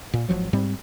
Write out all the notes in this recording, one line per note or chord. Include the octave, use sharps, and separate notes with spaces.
A#2
G#1 F#2 F3 F#3
G#2 G3 C4